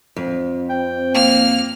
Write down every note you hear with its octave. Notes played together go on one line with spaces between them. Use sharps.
F2
C4 G5
A#3 F6